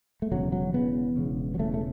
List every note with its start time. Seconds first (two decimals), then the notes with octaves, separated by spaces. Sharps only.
0.22 A3
0.32 E1 E2 C#3 F#3
0.52 F#3
0.74 E1 E2 C#3 B3
1.16 E1 E2 C#3
1.55 F#3
1.59 E1 E2 C#3 A3
1.74 A3